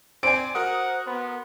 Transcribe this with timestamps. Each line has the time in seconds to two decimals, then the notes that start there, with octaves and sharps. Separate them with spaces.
0.23 C4 C5 D5 G#5 D7
0.55 F#4 A#4 F#5 D#6
1.07 B3 C6